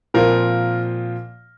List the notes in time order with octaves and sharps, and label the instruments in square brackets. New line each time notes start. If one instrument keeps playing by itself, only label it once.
[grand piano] A#2 F3 C4 F4 A#4